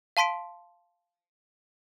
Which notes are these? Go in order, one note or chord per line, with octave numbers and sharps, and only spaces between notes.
F5 A5 C6 B6 D7